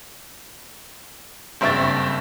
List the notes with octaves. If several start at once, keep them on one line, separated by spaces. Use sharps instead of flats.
F#1 G2 C4 E5 C#6 A6